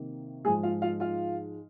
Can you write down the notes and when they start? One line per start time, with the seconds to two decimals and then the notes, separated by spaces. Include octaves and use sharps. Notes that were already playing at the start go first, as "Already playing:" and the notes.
Already playing: C3 D#3 A#3
0.45 G#2 F3 G#3 D#4 G#4 G#5
0.63 F4 F5
0.82 F4 F5
1.00 F4 F5